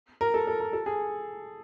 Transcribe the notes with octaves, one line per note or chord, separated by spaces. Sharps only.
A#4
A4
A4
A#4
A4
G#4